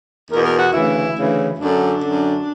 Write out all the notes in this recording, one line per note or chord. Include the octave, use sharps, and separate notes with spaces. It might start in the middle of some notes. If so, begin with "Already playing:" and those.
E2 B2 A#4
A#4
F#4
D2 C#3 E3 E4
D2 C#3 E3
F#2 D3 D4
F#2 D3